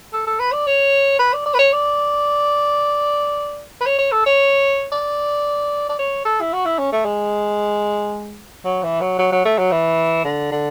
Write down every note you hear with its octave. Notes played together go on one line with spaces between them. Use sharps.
A4
A4
B4
D5
C#5
B4
D5
D5
B4
C#5
D5
B4
C#5
C#5
A4
C#5
D5
D5
C#5
A4
E4
F#4
E4
C#4
A3
G#3
F#3
E3
F#3
F#3
F#3
A3
F#3
E3
D3
D3